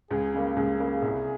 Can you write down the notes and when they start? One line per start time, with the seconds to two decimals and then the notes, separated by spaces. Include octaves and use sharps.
0.10 C#2 G#4
0.34 C#3 G3 A#3
0.56 C#2 G#4
0.79 C#3 G3 A#3
1.02 C2